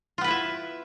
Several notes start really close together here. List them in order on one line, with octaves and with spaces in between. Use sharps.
F4 B3 B4 E4 E5